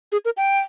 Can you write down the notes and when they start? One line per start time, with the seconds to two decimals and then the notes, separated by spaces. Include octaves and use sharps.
0.12 G#4
0.25 A#4
0.37 G5